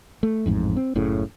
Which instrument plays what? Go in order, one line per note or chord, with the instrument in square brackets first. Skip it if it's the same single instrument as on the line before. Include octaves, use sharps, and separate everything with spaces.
[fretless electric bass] A3
A1 F2 G#2
C4
F#1 A2 C#3